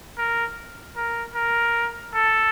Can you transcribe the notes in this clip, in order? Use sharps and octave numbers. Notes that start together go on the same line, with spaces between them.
A#4
A#4
A#4
A4